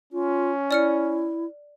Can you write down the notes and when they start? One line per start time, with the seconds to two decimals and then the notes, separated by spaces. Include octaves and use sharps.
0.13 C#4 F4
0.71 E4 D5 F6 C#7